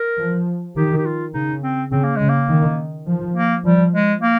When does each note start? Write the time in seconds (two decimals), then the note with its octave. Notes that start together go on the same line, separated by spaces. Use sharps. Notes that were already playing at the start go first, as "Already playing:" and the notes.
Already playing: A#4
0.18 F3
0.76 D#3 G4
0.97 G4
1.05 F4
1.34 C#3 D#4
1.63 C4
1.91 C#3 C4
2.04 A#3
2.17 C#3 G#3
2.29 A#3
2.49 D#3
3.07 F3
3.35 A#3
3.64 F3 G3
3.94 G#3
4.21 A#3